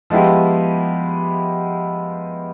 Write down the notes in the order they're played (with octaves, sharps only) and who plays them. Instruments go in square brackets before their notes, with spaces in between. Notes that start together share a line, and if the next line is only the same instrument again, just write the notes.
[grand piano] F3 G#3 B3 E4 G4